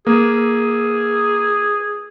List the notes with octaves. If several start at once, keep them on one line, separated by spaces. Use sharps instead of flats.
A#3 G#4